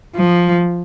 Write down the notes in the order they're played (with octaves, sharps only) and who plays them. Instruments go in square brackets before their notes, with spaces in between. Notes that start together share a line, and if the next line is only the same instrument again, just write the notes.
[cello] F3